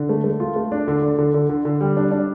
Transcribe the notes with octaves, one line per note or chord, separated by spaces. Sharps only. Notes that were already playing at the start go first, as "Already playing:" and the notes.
Already playing: D3
A3
A3
F4
A3
D4
D3
D3
D3
D3
D3
D3
G3
D4
D4